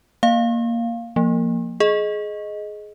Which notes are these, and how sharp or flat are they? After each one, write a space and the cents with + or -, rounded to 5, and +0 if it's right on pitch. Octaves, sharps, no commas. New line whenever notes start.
A#3 +0 F5 +0
F3 +0 A#3 +0
G#4 +20 D#5 +0